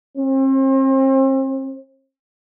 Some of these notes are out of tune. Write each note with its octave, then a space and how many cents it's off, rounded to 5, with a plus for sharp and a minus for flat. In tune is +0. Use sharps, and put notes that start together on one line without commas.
C4 +40